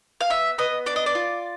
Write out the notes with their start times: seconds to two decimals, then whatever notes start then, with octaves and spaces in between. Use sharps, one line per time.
0.21 F5
0.30 B3 E5
0.58 B3 D#5
0.86 D4 D5
0.96 D#5
1.06 D5
1.15 F4